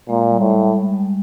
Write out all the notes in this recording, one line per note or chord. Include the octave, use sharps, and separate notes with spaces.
A#2 G#3
G3
A2
G#3